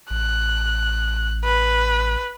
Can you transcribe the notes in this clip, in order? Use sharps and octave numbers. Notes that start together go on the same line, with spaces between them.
A1 F#6
B4